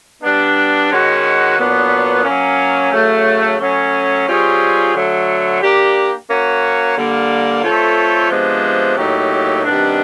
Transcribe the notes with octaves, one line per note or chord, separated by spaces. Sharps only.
G3 B3 D4
D#3 G#3 C#4 F#4
A#2 F#3 B3 D4
F#3 A#3 C#4
C#3 F#3 A3
F#3 A3 C#4
G3 C4 F4 G#4 C#5
D3 F#3 A3
A#3 D4 G4
A#3 C#4 F#4
D3 G3 A#3
A3 C4 F4 A4 C#5
C3 F3 G#3 B3 D4
A2 F#3 A#3 D#4 G4
C3 D#3 G3 B3 D4